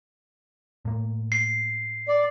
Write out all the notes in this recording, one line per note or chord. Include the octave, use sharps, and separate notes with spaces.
A2 A#3
C7
D5